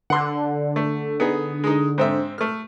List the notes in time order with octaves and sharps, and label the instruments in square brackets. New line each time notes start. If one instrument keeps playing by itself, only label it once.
[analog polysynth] D3 [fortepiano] F#5 C6
[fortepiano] A3
B3 D#4 G#4
G#3 D#4
G#2 C4 E5
A3 F6